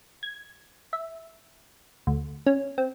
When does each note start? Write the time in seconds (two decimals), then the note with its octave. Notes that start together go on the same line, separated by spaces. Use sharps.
0.23 G#6
0.93 E5
2.07 D2
2.46 C#4
2.78 C4